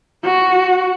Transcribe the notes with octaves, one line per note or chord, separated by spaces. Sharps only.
F#4